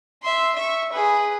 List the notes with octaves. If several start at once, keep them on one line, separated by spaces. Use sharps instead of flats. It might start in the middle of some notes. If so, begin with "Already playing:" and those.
E5 C6
E5 C#6
G#4 B4